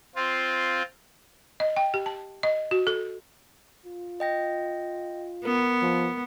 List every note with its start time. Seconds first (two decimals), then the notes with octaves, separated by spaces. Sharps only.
0.15 C4 F4
1.60 D#5
1.76 G5
1.94 G4
2.06 A5
2.43 D#5
2.71 F#4
2.87 A4
3.86 F4
4.20 D#5 G5 A#6
5.45 B3 A#4
5.82 F3